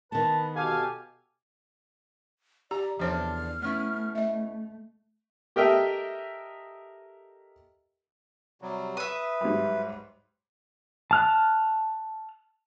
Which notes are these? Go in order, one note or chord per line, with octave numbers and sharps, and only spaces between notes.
D#3 B3 B4 A5
B2 G4 A4 F5 G#5
G4 D5 A#5
E2 C3 F3 D4 A4 C5 C#5 F6
A3 B3 C#4 E4
D#5 E5
G4 A4 A#4 D#5 E5 G5
C3 F#3 G3
B4 E5 D#6
G#2 F#3 G3
A5 F6 F#6